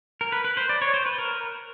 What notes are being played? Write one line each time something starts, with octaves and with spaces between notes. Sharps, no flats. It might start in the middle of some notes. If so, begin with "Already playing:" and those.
A#4
B4
B4
C5
D5
C#5
C5
B4
A#4